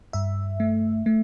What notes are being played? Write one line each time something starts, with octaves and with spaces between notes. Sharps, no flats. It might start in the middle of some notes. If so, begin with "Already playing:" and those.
G2 E5
A3
A3